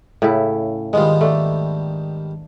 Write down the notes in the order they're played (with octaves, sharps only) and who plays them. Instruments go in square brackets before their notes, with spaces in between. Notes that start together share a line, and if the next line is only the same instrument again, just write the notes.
[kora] A2 C#3 E4
[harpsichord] G#2 D#3 G3 [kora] G#3 B3 F4
[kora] A3 D4